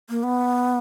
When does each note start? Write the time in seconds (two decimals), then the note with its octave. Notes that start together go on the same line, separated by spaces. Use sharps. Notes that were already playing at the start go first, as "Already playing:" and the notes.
0.09 A#3
0.23 B3